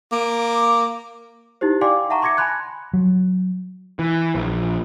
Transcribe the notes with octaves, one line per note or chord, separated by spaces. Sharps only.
A#3 D6
D#4 E4 G4 C5
D5 F5 G5 G#5 C6 D6
E5 F#5 A5 A#5 C#6
C6 D6 G#6 A#6 C#7
G#5 A5 B5 C6 F#6 G#6
F#3
E3
A#1